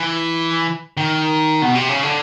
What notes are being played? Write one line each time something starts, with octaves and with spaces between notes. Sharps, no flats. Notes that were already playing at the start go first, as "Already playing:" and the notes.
Already playing: E3
D#3
B2
C3
C#3
D3